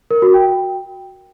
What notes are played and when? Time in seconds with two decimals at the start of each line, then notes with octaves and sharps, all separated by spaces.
0.11 A#4
0.22 F#4
0.34 G5